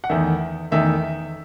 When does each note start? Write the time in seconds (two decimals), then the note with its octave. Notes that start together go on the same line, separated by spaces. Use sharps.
0.04 F#5
0.09 E2 D#3 A3 E5
0.71 E2 D#3 A3 E5